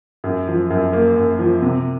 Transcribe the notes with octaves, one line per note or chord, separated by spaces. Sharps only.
F#2
F3
F#2
A#3
F#2
F3
C3